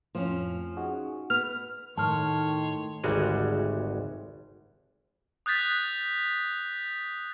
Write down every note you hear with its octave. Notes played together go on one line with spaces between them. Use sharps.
F2 A2 F3 C4 C#4
D#4 F#4 G#4
B3 F6
A2 D#3 C#5 A5 C6 F6
G#1 D2 G3 G#3 F#4 G#4
D#6 F#6 G6 A6 B6